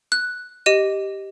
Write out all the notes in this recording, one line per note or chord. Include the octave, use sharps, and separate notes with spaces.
F#6
G4 D#5 D#7